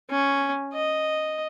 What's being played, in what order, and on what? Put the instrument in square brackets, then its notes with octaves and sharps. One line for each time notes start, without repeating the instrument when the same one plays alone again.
[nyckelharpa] C#4
D#5